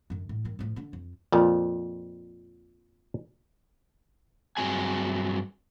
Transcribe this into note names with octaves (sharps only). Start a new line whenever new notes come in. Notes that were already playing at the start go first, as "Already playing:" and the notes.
F#2 D3
A2
G2 D#3
A2 F3
D3 D4
F2
F2 A#2 F3
G2 C3 F#3 C4 G#4 G#5